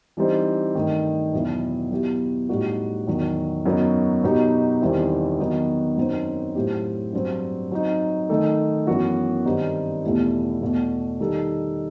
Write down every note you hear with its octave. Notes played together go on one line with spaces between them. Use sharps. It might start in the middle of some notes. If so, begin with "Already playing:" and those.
E3 G3 C4 D#4
G2 D#3 A3 D#4
E2 B2 F#3 B3 E4
F#3 B3 E4 G4
A2 G3 D#4 F#4
E2 D#3 F#3
F#2 F#3 B3 D#4 F#4
B2 F#3 B3 D#4 G4
E2 D#3 G3 C4 E4
D#3 F#3 B3 D#4 F#4
F#2 F#3 C4 D#4
A2 F#3 C4 E4 G4
G2 F#3 C4
F#3 C4 D#4
D#3 A3 D#4 A4
F#2 E3 B3 F#4
G2 D#3 G3 C4 D#4
E2 B2 A3 E4 G4
E2 B2 A3
D#3 G3 D#4 A4